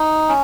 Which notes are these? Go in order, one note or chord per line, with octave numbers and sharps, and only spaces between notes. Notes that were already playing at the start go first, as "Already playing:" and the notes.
Already playing: D#4
C#4